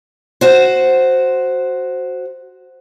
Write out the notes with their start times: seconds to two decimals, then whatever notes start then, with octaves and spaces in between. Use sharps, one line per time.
0.41 F#4 C5